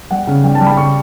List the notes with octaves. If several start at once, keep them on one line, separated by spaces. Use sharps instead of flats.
G3 F#5
C#3
G3 G5
A5
G3
B5
C#3 C#6